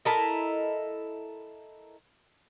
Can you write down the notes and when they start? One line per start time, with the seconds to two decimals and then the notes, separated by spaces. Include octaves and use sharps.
0.05 E4 A4 A#4 D#5